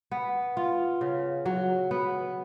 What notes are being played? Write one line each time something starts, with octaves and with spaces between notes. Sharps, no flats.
B3
F4
C#3
F#3
B3